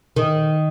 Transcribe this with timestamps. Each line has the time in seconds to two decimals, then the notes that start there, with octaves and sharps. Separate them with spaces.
0.16 D#3